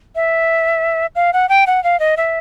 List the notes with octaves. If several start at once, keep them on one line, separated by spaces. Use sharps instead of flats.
E5
F5
F#5
G5
F#5
F5
D#5
E5